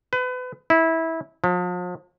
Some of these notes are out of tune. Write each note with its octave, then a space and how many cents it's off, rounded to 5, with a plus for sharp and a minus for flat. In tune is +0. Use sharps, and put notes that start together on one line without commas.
B4 +30
E4 -20
F3 +40